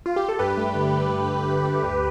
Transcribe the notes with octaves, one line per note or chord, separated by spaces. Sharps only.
F4
G4
A4
G2 G4 B4
A3
D3
D3
A3
G2
D3
A3
D2